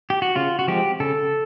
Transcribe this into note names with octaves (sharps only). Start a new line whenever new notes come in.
G4
F#4
C#3 F4
F#4
F3 G#3 C4 G4
C#3 A4